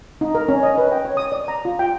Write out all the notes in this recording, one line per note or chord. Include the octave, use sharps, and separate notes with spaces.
D#4
A#4
C#4
D#5
B4
G5
C#5
D#6
D5
A#5
F4
G5